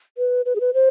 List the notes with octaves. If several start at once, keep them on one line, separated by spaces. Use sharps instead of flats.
B4
B4
G#4
B4
C5